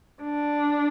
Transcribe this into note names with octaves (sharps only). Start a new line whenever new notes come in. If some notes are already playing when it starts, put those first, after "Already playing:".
D4